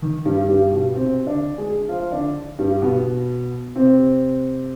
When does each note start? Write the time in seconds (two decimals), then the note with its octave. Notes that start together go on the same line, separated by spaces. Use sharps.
0.02 D#3
0.25 G2 G3
0.48 G2 G3
0.72 B2 B3
0.95 C3 C4
1.26 D3 D4
1.58 G#3 G#4
1.88 F3 F4
2.12 D3 D4
2.58 G2 G3
2.82 B2 B3
3.75 C3 C4